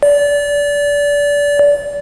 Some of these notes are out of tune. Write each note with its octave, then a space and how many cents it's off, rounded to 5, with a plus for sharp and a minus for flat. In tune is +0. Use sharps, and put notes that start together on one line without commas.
D5 -25